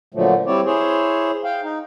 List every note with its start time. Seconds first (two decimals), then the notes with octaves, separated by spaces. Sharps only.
0.14 A#2 D3 F3 F#3 A3
0.46 G3 C4 E4 C#5 D5
0.66 E4 G#4 C5 C#5
1.44 F5 G5
1.63 D#4